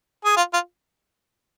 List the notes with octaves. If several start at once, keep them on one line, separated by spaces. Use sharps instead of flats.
G#4
F4
F4